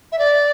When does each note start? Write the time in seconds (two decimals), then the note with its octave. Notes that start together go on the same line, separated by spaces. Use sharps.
0.12 E5
0.19 D5